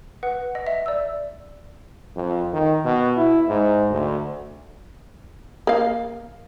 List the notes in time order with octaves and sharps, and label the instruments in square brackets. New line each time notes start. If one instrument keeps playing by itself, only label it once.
[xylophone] B4 F#5
D#5
E5
D5 E6
[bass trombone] F2
D#3
B2
E4
G#2
D2
[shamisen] A#3 F5